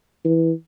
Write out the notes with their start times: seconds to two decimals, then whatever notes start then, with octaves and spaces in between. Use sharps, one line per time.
0.25 E3